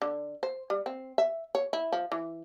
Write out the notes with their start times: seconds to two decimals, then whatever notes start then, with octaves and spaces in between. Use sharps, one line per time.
0.02 D3
0.43 C5
0.70 G3
0.86 C4
1.18 E5
1.55 C#5
1.73 E4
1.92 F3
2.12 E3